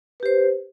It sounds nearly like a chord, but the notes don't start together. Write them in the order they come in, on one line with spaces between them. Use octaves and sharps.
B4 G4 C5